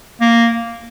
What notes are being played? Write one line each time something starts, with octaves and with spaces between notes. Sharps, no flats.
A#3